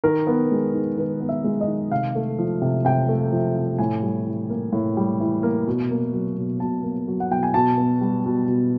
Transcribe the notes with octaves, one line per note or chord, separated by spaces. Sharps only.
D#3 A#4
B3
G#3
D#3
D#3 B4
B3
E5
G#3
D#5
D#3
C3 F5
A3
F3
C3
C3 G5
A3
F3
C3
A2 G#5
G3
E3
A#3
A2
G3
E3
A#3
B2
A#3
F#3
B2
B2 A5
A#3
F#3
F#5
B2 G5
G#5
B2 A5
B3
G3
B2
B2